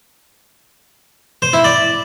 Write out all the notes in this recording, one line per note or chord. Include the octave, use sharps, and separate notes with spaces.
C5
E4
D5